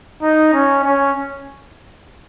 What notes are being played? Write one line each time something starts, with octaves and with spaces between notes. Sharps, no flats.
D#4
C#4
C#4